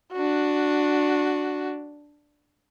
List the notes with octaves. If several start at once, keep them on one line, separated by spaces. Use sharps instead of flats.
D4 F#4